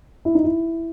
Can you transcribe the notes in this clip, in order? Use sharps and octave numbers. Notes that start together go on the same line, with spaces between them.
E4
D#4
E4